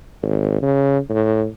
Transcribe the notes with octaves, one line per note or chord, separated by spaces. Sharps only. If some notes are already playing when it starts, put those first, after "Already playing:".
G#1
C#3
A2